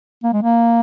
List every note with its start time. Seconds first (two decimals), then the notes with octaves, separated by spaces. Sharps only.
0.23 A#3
0.33 G#3
0.42 A#3